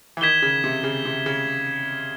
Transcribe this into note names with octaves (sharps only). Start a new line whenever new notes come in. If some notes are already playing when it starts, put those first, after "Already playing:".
E3
D#3 G#6 B6 E7 G7
C#3
C3
C#3
C3
C#3